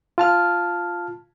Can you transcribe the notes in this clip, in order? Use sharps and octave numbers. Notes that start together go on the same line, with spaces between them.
F4 A5 F6